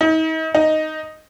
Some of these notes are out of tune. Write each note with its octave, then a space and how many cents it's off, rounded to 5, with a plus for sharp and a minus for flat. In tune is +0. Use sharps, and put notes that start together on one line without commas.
D#4 +40
D#4 +0